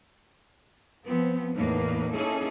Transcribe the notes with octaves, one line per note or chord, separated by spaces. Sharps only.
F3 B3 C4
E2 A2 A#3 D#4 B4
A#3 C#4 D#4 E4 G#4 A4